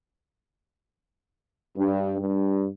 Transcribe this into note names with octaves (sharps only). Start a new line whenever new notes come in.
G2
G2